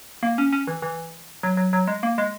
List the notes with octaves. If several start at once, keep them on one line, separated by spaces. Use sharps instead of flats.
A#3
C#4
C#4
E3
E3
F#3
F#3
F#3
G#3
A#3
G#3